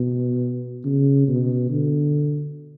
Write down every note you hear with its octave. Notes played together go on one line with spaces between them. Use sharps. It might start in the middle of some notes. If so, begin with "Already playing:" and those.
Already playing: B2
C#3
B2
D3